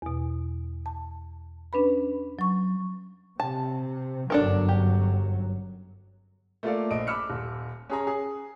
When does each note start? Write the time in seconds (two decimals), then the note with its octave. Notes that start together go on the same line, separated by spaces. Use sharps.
0.02 E2 B2
0.86 A5
1.73 C#4 D4 B4 B5
2.39 F#3 C#6
3.40 C3 A5
4.30 G1 F#2 F#3 D4 A4 A#4
4.69 G4
6.63 A3 A#3 F4 A4 D5 F5
6.91 A#1 D#5 D7
7.07 B5 D6 E6 F6 C#7
7.30 D#1
7.90 C#4 G#4 A#5
8.07 G#4